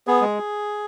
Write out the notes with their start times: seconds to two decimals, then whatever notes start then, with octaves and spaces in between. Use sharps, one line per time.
0.07 B3 G#4
0.21 G#3